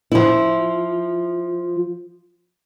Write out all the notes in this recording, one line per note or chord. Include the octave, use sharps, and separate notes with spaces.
F3 E4